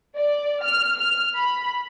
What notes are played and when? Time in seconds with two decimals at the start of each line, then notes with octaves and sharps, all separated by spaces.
0.17 D5
0.63 F6
0.97 F6
1.36 B5